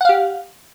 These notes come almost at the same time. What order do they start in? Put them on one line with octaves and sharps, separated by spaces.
F#5 F5 G4